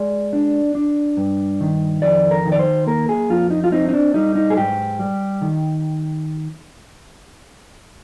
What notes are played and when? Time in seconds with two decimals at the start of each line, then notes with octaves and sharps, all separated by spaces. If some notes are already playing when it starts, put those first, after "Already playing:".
Already playing: G#3 D5
0.33 D4
0.75 D4
1.17 G2
1.61 D#3
2.02 F2 D5
2.31 A#4
2.45 D#3
2.52 D5
2.59 C5
2.87 A#3 A#4
3.09 G#4
3.30 F2 F4
3.51 D#4
3.64 F4
3.72 C4 D#4
3.89 D#4
3.94 D4
4.14 G3 D#4
4.35 D#4
4.50 G#4
4.57 G#2 G4
4.99 G3
5.42 D#3